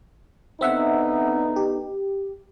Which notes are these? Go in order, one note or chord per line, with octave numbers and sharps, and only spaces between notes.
D3 B3 C4 D#4 E5 F#5
G4